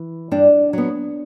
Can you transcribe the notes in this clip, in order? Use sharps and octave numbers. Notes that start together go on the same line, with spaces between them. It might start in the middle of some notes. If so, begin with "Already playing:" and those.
Already playing: E3
G2 D4
F#3 B3